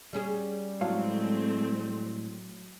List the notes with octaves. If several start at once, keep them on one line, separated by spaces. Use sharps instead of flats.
G3 C#4 G#4
A2 F#3 G#3 A3 C4 F5